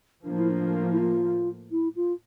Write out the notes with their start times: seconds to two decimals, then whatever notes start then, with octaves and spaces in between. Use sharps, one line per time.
0.24 A2 F3 A#3 D4
0.38 E4
0.50 D4
0.91 E4
0.98 F4
1.71 E4
1.96 F4